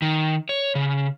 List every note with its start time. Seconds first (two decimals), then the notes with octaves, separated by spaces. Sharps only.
0.02 D#3
0.49 C#5
0.75 C#3